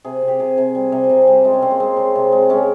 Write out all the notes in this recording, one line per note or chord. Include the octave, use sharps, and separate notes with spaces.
C3 G#4
C3
G4
C3 G#4
C3 G#4
G3
C3
G#4
C3 A#4
G#4
G3
G4
G#3 F4
C#4
C#3 C4
A#3
G#3 C4
C#3
C3
G#3
G#3 C#4